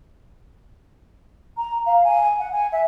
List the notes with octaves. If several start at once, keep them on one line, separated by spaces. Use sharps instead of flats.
A#5
F5
G#5
F#5
G#5
E5